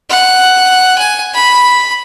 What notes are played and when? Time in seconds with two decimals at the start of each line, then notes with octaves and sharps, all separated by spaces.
0.10 F#5
0.98 G#5
1.34 B5